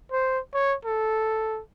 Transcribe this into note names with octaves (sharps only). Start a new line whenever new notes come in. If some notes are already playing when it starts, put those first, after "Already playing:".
C5
C#5
A4